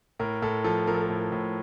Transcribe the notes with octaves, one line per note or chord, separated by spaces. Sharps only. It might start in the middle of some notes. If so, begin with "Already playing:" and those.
A2 A#4
A2 A4
F3 A4
F3 A#4
A4
A#4
A2
A#4
A2